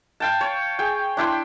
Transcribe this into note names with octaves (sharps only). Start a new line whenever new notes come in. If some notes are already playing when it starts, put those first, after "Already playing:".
F5 G5 A5
C#5
G#4 G5
D4 E4 G5 C6